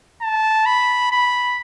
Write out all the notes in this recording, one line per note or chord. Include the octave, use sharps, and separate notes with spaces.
A5
B5
B5